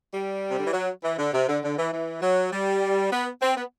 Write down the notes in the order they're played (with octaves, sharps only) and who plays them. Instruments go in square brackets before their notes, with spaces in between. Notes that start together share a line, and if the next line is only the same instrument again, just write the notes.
[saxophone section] G3
C3
D3
E3
F#3
E3
D3
C3
D3
D3
E3
E3
F#3
G3
B3
C4
B3